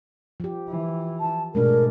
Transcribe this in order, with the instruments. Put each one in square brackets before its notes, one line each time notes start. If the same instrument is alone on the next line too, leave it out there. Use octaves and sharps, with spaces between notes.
[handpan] F3 G4
[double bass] E3
[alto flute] A5
[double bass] G#2 B2 [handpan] G#3 A3 D4 [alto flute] A#4